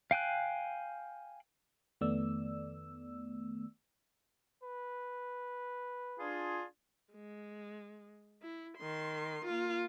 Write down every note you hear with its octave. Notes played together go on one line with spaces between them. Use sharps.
F5 G5 G#5 F#6
F2 D#3 A3 B3 D5 E6
B4
D4 F4 G#4
G#3
E4
D#3 C6
A#3 F4